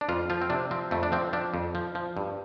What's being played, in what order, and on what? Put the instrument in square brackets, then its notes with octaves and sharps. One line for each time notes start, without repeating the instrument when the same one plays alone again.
[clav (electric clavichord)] D4
F2 F4
F3 F4
C4
C3 D4
F3 C4
F2 A3
D4
F3 C4
F3 D4
F2
F3
F3
G2